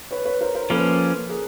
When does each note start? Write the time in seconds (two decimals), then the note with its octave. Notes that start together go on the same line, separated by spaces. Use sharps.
0.11 B4 C#5
0.25 B4 C#5
0.41 A#4 C5
0.55 A#4 C5
0.70 F3 A#3 C#4 A4 B4
1.29 G#4 A#4